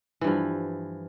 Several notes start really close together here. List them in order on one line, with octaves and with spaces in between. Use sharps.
E3 G2 F3